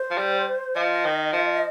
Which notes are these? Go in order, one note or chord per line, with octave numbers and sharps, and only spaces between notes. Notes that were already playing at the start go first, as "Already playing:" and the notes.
Already playing: C5
F3
G3
F3 D#5
D#3
F3